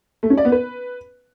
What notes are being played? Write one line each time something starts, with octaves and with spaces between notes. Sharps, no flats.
A3
C#4
D5
B3
B4